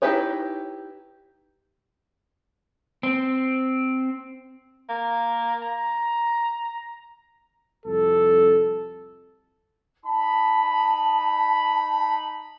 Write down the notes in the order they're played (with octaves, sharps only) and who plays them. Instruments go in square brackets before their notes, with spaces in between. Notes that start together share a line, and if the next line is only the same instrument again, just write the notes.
[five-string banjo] D#4 E4 G4 B4 C#5
[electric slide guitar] C4
[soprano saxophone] A#3
A#5
[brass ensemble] C2 F2 A4
[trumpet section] D#4 B5 [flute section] A5